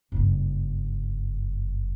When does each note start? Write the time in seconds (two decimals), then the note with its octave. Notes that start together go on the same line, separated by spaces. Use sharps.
0.12 F#1 G2